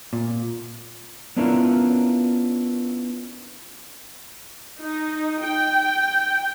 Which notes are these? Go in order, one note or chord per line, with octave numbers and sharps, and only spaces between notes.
A#2
B3 C#4 D4 E4 F4 A#4
D#4
G5